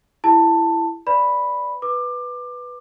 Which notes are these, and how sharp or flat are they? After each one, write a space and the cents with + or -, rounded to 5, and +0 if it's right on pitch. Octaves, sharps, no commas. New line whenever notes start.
E4 +15 G4 +40 A5 +15
B4 +25 D5 +0 B5 +0
B4 +0 D6 +25